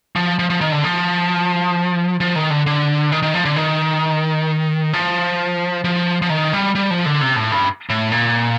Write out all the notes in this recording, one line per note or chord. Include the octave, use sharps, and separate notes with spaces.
F3
F3
F3
D#3
D3
F3
F3
D#3
D3
D3
D#3
D#3
F3
D3
D#3
F3
F3
F3
D#3
G3
G3
F3
D3
C3
A2
G2
A2
A#2